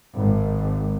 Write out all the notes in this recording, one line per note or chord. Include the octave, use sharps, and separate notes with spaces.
G#1